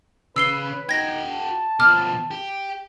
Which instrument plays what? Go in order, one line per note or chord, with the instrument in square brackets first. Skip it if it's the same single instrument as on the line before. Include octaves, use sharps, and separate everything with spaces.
[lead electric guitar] C#3 [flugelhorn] B4 [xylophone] E6 C7 G7
[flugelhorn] D#4 [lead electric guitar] F#4 G5 [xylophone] G#6 A#6
[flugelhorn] A5
[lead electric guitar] B2 F3 [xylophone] D6 F6
[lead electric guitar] G4